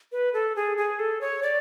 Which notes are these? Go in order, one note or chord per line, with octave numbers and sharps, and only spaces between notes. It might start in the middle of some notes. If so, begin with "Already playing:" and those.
B4
A4
G#4
G#4
A4
C#5
D5